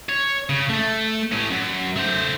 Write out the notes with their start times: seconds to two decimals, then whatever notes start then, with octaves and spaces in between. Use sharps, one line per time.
0.09 C#5
0.49 C#3
0.69 A3
1.32 A2 C#4
1.50 F#2
1.96 A3 C5